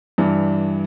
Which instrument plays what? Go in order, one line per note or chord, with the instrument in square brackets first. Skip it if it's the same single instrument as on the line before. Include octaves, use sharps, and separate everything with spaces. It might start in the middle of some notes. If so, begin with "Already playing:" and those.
[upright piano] G2 E3 D4